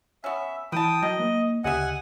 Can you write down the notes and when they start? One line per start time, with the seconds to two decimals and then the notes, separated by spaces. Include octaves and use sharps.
0.24 B3 C#4 E5
0.72 E3 B4 G5 A5 D#6
1.02 D#3 F#3 D#5
1.19 A#3
1.64 D2 C#3 G4 D#5 E5 F#5 G#5